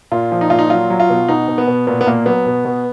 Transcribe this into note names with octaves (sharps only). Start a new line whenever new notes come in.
A#2 F4
F3
D#4
A#2 F4
D#4
F#3 F4
F#3
F4
B2
B2 D#4
B2
B3
B2
A#2 B3
B3
A#2 A#3
F#3 B3
B2
B2